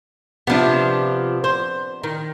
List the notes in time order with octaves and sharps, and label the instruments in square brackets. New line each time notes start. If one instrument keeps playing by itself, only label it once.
[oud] C3 F3 [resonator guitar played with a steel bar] B3 D4
[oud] C5
D#3